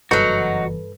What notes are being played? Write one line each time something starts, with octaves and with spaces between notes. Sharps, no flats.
F#1 G2 E3 F#3 D#4 F#4 A4 B4